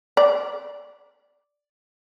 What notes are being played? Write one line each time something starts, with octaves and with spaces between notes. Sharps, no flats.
D5